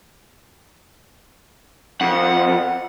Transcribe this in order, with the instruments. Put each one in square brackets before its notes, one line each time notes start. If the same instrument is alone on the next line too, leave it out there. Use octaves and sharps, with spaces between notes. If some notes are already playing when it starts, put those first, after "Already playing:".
[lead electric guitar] F2 [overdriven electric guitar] F#5